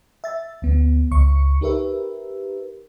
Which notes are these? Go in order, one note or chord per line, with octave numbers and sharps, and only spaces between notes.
E5 A6
D2 B3
C#2 C#6 C#7
D#4 G4 A#4 B4 E5